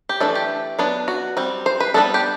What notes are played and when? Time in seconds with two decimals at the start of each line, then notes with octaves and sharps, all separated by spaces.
0.09 G4
0.20 E3 A3 D4 A4
0.35 G4
0.79 F#3 B3 D4
1.08 F#4
1.37 G3 C4
1.66 C5
1.80 B4
1.94 G3 B3 D4 A4
2.14 G4